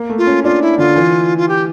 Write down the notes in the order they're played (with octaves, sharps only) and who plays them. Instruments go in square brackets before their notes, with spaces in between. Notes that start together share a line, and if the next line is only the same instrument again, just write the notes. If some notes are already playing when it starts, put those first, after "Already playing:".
Already playing: [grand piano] A#3
A3
[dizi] F4
[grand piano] C#4
[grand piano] D4 [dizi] F4
[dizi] E4
[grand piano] D3 [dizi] F4
[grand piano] E3
[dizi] F4
G4